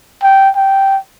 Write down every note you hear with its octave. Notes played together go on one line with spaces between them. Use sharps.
G5
G5